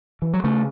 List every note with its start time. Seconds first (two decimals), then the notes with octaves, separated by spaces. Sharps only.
0.22 E3
0.34 F#3
0.44 C#3 A3